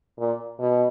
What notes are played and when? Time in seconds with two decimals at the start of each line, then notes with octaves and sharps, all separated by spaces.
0.18 A#2
0.59 B2